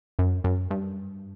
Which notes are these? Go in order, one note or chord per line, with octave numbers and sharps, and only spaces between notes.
F#2
F#2
G2